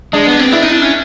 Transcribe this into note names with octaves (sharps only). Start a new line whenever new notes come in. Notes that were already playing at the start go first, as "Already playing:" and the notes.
G#3 D4
B3
C4
D4 E4
D#4
D4
C#4